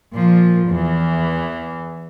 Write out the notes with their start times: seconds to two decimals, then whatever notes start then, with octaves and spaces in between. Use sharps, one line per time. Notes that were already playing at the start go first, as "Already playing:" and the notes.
0.13 A#2 F3
0.68 E2 E3